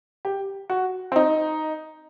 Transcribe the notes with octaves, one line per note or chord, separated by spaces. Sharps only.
G4
F#4
C4
D#4